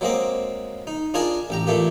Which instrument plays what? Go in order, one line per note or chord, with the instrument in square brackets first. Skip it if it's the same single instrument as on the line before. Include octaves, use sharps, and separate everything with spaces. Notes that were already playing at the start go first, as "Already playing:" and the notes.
[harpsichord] F#3 G#3 A#3 C4 D#5 D6
D#4
D4 F4 G#4 A#4 D#5 G#5
A1 G4 A#5
A#2 E3 A3 A#3 G4